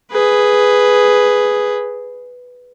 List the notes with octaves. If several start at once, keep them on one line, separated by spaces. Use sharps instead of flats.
G#4 B4